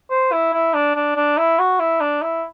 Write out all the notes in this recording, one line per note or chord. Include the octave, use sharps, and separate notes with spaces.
C5
E4
E4
D4
D4
D4
E4
F#4
E4
D4
E4